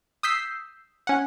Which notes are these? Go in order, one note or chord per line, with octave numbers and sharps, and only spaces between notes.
D#6 E6 G6 B6 C7
C#4 F#5